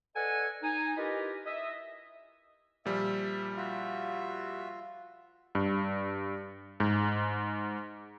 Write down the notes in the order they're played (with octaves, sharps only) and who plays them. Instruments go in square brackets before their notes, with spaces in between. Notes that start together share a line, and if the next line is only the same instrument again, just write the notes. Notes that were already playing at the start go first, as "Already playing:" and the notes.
[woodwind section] A4 B4 D5 D#5 F#5 G#5
D#4 G#5
E4 F4 G4 A#4 B4 D#5
D#5 E5
[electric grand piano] A#2 F3 G3 [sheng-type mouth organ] E5
[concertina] F4 [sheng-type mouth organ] F#4 E5
[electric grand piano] G2
G#2